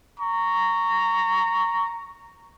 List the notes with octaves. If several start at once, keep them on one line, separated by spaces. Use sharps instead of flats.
A#5 C#6